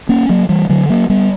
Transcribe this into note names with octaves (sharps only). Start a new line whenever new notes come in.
A#3 C#4
F#3 A#3
E3 G3
D3 F#3
F#3 A#3
G3 B3